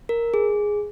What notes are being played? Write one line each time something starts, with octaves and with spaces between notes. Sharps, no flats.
A#4
G#4